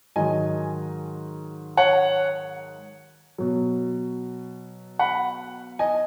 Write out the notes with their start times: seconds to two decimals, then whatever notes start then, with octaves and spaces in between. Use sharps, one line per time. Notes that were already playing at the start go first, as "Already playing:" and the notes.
0.16 G#2 D#3 F#3 D#5 G#5
1.77 C#5 F#5
3.38 B2 F#3
4.99 F#5 B5
5.79 D#5 G#5